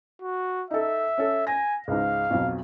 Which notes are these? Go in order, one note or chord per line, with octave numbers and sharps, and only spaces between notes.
F#4
D#4 A4 E5
C#4 A4
G#5 A#6
C#2 G#2 F5
B1 F2 F#3